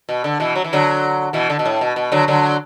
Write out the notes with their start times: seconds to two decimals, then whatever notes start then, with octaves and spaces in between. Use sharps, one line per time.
0.09 B2
0.24 D3
0.40 B2 E3
0.56 F#3
0.64 E3
0.73 D3 F#3
1.33 B2 E3
1.50 D3
1.59 B2
1.66 A2
1.81 B2
1.96 B2
2.12 D3 F#3
2.28 D3 F#3